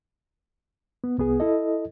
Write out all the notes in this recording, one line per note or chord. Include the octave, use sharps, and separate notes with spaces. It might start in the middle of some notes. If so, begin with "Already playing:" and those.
B3
C2 B3 G#4
E4 A4 D#5